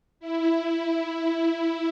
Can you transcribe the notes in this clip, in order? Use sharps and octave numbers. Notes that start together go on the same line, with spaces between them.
E4